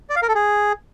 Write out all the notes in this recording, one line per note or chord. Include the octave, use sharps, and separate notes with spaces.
D5
F5
A#4
A4
G#4